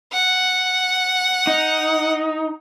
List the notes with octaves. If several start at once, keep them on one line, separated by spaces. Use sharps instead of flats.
F#5
D#4